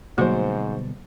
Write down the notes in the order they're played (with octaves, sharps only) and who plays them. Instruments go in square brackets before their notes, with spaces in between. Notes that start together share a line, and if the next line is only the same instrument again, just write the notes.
[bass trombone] G#2 [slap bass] B2 D3 G3 [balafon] F#3 A#3 [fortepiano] F#4 C5